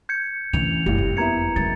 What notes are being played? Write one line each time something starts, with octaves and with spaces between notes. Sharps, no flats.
G6 G#6 C#7
D2 E3 C#4 F7
F#1 C2 A2 G3
F2
A#3 B3 E4 A#5 G#6 C#7
C#2 F#3 A6